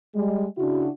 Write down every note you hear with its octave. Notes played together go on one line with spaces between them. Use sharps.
G3 G#3
C#3 D4 E4 F#4